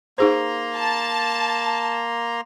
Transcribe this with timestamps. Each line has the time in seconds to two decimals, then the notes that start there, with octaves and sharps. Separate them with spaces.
0.18 A#3 D#4 G#4 C5 A#5 C6
0.75 A5